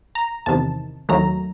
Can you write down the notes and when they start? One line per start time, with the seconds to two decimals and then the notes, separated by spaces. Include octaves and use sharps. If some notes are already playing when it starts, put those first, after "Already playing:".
0.15 A#5
0.46 E2 C3 D#3 A5
1.09 D#2 D#3 F#3 A3 A#5